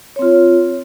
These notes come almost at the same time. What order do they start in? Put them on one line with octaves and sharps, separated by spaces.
C#5 C4 F4